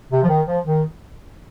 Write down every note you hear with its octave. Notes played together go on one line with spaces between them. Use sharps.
C3
F3
D#3
F3
D#3